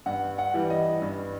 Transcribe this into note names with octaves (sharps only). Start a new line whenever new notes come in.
G2 F#5
F#5
E3 G3
D#5
G2